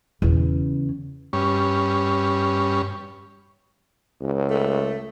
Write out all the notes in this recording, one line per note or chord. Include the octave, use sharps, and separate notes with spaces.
E2 C#3
G2 C#4
C#2
A3